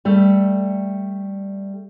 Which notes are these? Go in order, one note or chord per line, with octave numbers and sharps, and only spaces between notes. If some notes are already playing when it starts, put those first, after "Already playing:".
G3 A3